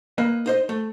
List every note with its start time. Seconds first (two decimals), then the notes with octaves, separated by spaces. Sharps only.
0.18 A#3 B4 D#5
0.46 D#4 C5 D#5
0.69 A3